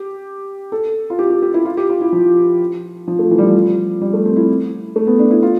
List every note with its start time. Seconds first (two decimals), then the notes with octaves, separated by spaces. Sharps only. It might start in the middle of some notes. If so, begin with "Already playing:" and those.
Already playing: G4
0.72 A4
1.10 F4
1.19 G4
1.30 G4
1.42 G4
1.54 E4
1.65 F4
1.77 G4
1.89 F4
2.00 E4
2.13 F3
3.08 F3
3.19 A3
3.31 E3
3.38 G3
3.42 F3
4.01 G3
4.14 A3
4.25 C4
4.36 E4
4.96 A3
5.07 B3
5.19 D4
5.31 E4
5.42 F4